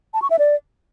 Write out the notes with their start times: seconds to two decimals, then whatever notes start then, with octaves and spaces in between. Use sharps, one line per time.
0.14 A5
0.22 C#6
0.30 E5
0.39 D5